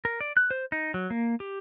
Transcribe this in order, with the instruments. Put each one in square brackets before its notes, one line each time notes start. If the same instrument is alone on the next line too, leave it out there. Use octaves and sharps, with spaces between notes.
[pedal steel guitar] A#4
D5
F#6
C5
D#4
F#3
A#3
G4